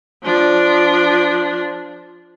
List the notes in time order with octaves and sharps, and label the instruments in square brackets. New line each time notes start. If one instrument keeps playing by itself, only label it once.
[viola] F3 D4